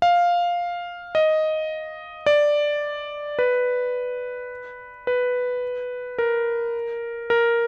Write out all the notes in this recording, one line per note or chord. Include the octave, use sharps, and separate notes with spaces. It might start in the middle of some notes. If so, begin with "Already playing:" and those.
F5
D#5
D5
B4
B4
A#4
A#4